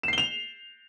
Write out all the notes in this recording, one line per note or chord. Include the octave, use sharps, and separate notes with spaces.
C7 E7 F7 G7